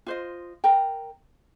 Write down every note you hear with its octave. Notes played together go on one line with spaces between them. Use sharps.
F4 C5 D#5
A#4 G5 A#5